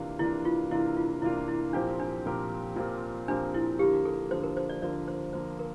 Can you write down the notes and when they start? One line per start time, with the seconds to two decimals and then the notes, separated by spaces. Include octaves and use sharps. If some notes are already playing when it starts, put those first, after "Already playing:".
Already playing: C3 E3 A#3 D4 F4
0.19 C3 E3 A#3 D4 E4 F4
0.45 F4
0.71 C3 E3 A#3 D4 E4 F4
0.96 F4
1.22 C3 E3 A#3 D4 E4 F4
1.48 E4
1.73 A#2 F3 C4 D4 G4 A#4
2.00 D4
2.26 A#2 F3 C4 G4 A#4
2.76 A#2 F3 C4 G4 A#4
3.28 A#2 F3 C4 D4 G4 A#4
3.54 E4
3.79 D3 F3 A#3 G4
4.05 A4
4.31 D3 F3 A#3 C5
4.43 A#4
4.57 C5
4.69 D5
4.82 D3 F3 A#3 D5
5.08 C5
5.33 D3 F3 A#3 C5
5.59 A#4